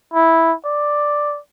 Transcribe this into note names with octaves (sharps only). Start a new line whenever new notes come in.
E4
D5